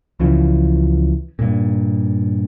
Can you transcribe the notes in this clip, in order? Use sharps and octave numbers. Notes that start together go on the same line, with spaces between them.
C#2 C#3 E3 F3
G2 A#2